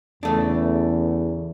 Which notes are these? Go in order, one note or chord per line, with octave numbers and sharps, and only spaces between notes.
E2 C#3 A3 D4